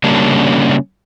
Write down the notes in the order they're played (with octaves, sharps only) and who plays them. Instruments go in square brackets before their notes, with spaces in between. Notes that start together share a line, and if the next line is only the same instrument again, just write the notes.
[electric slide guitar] C#3 G3 A#3 C#4 D4